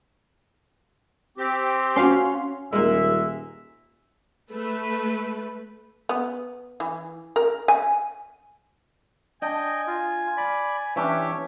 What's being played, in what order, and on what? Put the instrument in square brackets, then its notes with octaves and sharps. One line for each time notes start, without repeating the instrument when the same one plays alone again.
[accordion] C4 G4
[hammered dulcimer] C#4 [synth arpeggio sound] F#4 F5 C6
[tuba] D#1 [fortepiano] G#3 A#3 [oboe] E5
[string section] A3 B4
[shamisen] B3
E3
A#4
G#5
[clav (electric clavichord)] D4 [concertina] D#5 G5 [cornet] G#5
[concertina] F4
D5 B5
[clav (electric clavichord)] E3 C#4 D4 [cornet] G4 [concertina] C#5 E5